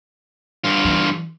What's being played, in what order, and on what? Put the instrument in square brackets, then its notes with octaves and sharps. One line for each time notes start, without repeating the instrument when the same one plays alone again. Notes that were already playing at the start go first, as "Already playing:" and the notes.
[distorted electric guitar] G2 F4
[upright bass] E3 G3